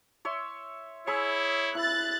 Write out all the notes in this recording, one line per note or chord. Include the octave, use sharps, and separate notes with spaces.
C#5 E5 C6
E4 G#4 C#5 B5 E6
E4 F#6 A6